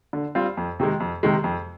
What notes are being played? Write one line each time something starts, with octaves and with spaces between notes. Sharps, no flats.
D3
G3 C4 F4
F2
C3 D#3 G#3
F2
C3 D#3 G#3
F2